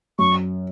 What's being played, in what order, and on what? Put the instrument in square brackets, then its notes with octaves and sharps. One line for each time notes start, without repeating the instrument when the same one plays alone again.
[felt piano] F#2 [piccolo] C#6